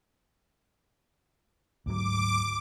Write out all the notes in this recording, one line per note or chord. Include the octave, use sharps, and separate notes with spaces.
D2 G#2 F#3 D6